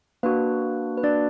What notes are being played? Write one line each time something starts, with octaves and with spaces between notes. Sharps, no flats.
A#3 D4 F#4 B4
B4
D4 D5